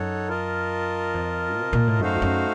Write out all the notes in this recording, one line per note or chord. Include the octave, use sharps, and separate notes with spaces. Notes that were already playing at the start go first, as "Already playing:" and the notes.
Already playing: F#2 D#4 A4 C#5 F#5
F4 A#4 D#5 A5
F2
C3
A#2
A2
F#2 A3 D#4 F#4 C5 F5
F2
F#2